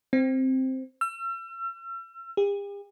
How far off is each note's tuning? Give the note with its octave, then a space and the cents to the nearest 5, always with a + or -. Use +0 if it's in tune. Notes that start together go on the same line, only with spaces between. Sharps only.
C4 +0
E6 +40
G4 +45